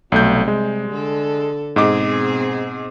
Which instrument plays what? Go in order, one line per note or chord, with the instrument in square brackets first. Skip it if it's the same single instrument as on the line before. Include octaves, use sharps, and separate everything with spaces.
[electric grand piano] B1 A3 G6 [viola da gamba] C3 G3
[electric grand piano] G#3
[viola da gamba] D3 A4
[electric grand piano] G#2 D#5 D6 [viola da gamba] B2 C4 G#4